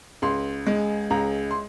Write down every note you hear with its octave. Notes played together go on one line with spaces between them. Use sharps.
C#2 C6
G#3
C#2 A#5
C6